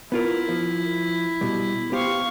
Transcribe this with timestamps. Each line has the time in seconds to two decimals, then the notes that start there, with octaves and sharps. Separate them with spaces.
0.12 B3 E4 F4 A#4
0.49 F3
1.41 B2 G3
1.92 B3 G4 C5 F5 C#6